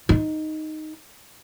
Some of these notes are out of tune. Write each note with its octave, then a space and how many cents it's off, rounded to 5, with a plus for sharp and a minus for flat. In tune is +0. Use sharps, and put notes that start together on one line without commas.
D#4 +0